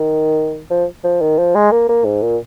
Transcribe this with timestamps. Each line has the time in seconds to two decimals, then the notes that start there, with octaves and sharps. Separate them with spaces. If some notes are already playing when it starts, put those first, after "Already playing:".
Already playing: D#3
0.71 F3
1.04 F3
1.21 D#3
1.39 F3
1.55 G#3
1.71 A#3
1.89 A#3
2.05 G#2
2.22 A#2